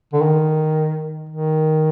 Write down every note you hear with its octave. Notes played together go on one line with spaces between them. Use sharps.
D3
D#3
D#3